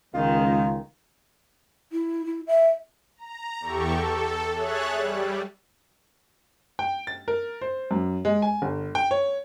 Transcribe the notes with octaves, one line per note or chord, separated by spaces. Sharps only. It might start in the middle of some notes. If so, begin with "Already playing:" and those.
C#2 D#3 G#3 F4
E4
E4
E5
A#5
E2 G4 A4 C#6
A4
G#4 C#5 E5 F#6 A6
G3
G5
A6
A#4
C5
F#2
G#3
G#5
G1
G5
C#5